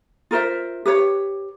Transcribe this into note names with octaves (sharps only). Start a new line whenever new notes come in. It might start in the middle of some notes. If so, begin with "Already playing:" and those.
F4 A#4 C5 E5
G4 B4 C#5